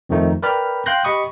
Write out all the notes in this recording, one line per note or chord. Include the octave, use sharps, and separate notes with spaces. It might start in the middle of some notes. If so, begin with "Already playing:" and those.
F2 D#3 F3 A3 D#4
A#4 B4 D5 G5 B5 F6
F5 G5 C6 F#6 G6 A#6
G4 D#5 B5 C#6 D#6